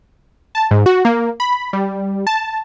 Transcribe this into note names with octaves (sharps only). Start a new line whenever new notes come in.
A5
G#2
F#4
A#3
B5
G3
A5